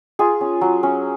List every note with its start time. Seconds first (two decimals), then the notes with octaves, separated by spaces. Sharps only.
0.19 F4 G#4
0.41 C#4
0.61 F#3
0.83 C#4